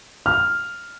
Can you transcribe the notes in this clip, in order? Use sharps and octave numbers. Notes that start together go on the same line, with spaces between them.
F6